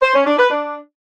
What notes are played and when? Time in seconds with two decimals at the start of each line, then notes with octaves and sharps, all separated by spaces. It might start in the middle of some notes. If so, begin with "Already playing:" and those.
0.02 C5
0.14 C#4
0.26 D4
0.38 B4
0.50 D4